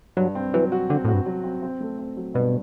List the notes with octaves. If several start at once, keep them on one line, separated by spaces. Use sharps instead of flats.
G2 F#3
C4
E3 F#3
F#4
D3 C4
A2 F#4
G2
F#3
C4
C4
A3
C4
F#3
G2 B2